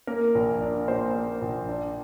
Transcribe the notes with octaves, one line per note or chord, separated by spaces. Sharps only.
A#3 A#4
A#1
D4
A#2 C5
A#3
A#1
D4